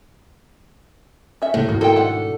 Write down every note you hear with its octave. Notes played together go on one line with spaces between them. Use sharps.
C#4 E5
A2 C3 A#3
G#2 B2 D#3 A#3
A#3 F4 A4 G5
A3 D4 F#5